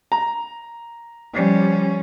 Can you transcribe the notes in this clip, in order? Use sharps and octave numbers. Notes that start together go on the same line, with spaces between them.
A#5
F3 G3 C#4